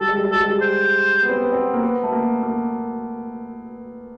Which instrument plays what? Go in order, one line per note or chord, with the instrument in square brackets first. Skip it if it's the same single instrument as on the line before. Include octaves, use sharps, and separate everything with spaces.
[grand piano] G3 [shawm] A4
[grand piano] G#3
G3
G#3
[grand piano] G3 [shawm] A4
[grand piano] G#3
G3
[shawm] C5
[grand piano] B3
C4
B3
C4
A#3
B3
A3
A#3
A#3